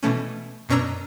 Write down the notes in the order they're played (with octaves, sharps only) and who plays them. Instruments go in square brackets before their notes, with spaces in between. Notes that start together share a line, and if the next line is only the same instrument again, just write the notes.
[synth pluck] B2 E3 A3 C#4
F#2 B2 C#4 D4 A#5 E6